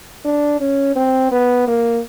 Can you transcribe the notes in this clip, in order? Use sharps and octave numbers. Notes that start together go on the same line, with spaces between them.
D4
C#4
C4
B3
A#3